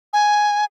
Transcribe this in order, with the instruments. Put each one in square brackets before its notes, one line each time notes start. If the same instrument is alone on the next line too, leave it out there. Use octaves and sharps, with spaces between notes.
[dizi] G#5